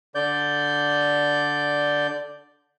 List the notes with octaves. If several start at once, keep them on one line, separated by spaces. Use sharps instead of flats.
D3 D5 G6